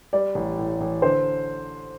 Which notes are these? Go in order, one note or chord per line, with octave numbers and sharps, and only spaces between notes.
G3 D5
A1
A2
A1
D3 C5